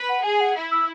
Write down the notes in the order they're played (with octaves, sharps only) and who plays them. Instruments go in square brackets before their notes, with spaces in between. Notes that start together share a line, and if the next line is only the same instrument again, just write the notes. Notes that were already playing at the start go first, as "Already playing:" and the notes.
Already playing: [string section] B4
[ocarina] F#5
[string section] G#4 [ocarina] G#5
[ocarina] F#5
[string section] E4
[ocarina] E6